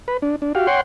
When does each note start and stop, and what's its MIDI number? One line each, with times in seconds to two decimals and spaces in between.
0.08 0.17 71
0.22 0.36 62
0.42 0.53 62
0.55 0.67 66
0.55 0.67 67
0.55 0.67 77
0.67 0.81 73
0.67 0.81 78
0.67 0.81 79
0.67 0.81 84